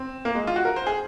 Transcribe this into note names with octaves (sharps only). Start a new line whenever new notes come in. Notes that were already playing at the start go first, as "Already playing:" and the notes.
Already playing: C4
A#3
G#3
F4
F#4
A#4
C5
G#4